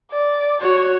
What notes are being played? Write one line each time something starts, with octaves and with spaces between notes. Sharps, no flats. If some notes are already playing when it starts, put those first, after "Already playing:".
D5
F#4 C#5